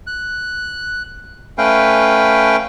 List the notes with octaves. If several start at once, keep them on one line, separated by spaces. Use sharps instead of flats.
F#6
A3 C#4 B4 F5 G5